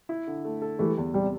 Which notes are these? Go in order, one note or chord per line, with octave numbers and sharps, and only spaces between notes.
E4
D3
A3
A4
E3 G3 A3
E2
C3 G3